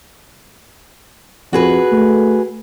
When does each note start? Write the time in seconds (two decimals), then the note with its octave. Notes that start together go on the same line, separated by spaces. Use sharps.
1.53 F2 F#4 G#4 B4
1.92 A3